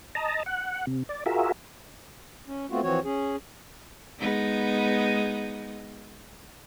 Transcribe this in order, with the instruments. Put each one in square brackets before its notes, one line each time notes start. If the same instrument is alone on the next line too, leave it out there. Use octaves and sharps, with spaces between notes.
[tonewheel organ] D#5 A5 A#5
F#5
C3
D5
F4 F#4 G#4 A#4 E5
[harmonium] C#4
A3 B3 C4 F4 F#4
E3 F3 C4 F#4 C#5
C#4 G#4
[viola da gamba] G#3 B3 D#4